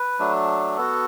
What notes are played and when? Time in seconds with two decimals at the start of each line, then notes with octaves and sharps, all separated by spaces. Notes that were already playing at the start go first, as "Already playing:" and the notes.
Already playing: B4
0.19 F#3 A3 D4
0.77 B3 F#4 A4